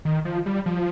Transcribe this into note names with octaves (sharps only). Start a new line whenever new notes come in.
D#3
F3
G3
F3